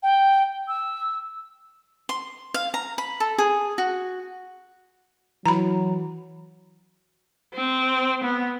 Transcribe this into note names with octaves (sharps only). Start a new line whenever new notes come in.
G5
E6
C6
F5
A#5
B5
A4
G#4
F#4
E3 F#3 A#5 B5
C4
B3